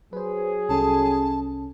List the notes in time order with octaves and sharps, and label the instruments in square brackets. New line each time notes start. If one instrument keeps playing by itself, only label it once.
[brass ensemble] F#3 G#4 [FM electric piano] B4 C5
[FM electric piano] C2 C#4 A4 [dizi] A5